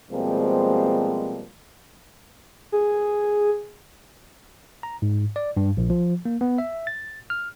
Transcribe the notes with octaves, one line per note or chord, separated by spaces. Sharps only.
B2 F3 G3 G#3 A#3 C4
G#4
A#5
G#2
D5
G2
A#1
F3
A#3
B3
E5
A6
F6